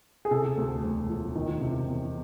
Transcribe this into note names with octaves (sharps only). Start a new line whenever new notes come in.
G#4
C3 A4
D2
E1
F3
D#3
C3
E2